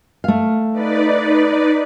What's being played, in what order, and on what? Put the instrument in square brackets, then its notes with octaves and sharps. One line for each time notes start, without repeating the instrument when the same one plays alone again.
[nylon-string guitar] A3 F5
[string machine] D#4 B4 D5